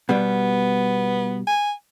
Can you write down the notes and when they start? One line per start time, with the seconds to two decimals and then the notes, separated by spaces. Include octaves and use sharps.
0.09 B2 G3 B3
1.47 G#5